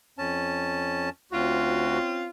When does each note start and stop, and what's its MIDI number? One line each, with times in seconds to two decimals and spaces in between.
0.18 1.10 41
0.18 1.10 61
0.18 1.10 81
1.32 1.98 38
1.32 2.30 60
1.32 2.30 61
1.32 2.30 65
1.32 1.98 66